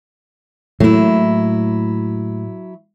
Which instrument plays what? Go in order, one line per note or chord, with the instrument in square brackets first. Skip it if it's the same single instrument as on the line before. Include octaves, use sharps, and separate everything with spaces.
[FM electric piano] A2 [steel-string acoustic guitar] F#3 E4 [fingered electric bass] A3 A#3